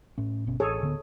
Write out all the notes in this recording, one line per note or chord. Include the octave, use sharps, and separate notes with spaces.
A2 C#4
G1 B2 C#4
A1 G#4 A4 C#5
D1 D3 B3